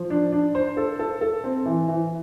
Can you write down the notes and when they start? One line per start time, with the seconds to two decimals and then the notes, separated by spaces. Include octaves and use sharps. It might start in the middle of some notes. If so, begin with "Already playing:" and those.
Already playing: F3
0.10 D4
0.32 D4
0.55 C5
0.77 A4
0.99 A4
1.21 A4
1.44 C4
1.65 E3
1.88 E3